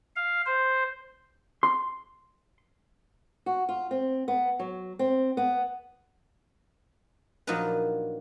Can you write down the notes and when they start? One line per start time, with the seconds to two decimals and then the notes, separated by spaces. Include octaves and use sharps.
0.16 F5
0.46 C5
1.63 C6
3.46 F#4
3.69 F4
3.91 C4
4.28 B3
4.59 F#3
4.99 C4
5.37 B3
7.47 A#2 F3 F#3 D4 D#4 B4